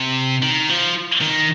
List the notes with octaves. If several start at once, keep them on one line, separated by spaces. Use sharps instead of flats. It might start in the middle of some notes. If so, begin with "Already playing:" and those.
Already playing: C3
D#3
F3
D#3